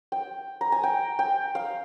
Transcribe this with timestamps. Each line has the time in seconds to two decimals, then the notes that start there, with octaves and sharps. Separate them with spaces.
0.12 G5
0.61 A#5
0.72 G#5
0.83 G5
1.19 G5
1.55 F5